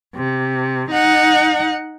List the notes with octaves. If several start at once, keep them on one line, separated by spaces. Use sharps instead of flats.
C3
D#4 F#5